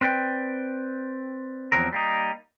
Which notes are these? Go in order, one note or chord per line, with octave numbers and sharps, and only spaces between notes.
C4 B4 D5 G5
E2 C3 F3 F#3 C4 A#4
G3 A#3 D#4